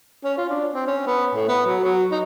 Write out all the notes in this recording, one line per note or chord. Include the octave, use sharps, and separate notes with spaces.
C#4
F4
D4
C4
C#4
B3
A2
B3
F#3
F#3
D#4